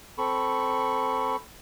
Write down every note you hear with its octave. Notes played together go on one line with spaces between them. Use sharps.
C4 A4 B5 C#6